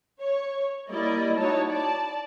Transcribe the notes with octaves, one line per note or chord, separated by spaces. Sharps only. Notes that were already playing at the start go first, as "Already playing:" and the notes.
C#5
G3 A#3 E4 D5 D#5
D#4 E4 F#4 C#5 A5
D5 A5